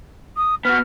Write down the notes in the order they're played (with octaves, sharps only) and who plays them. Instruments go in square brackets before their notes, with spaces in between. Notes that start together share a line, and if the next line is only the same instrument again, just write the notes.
[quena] D#6
[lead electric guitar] B3 F#4 [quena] F6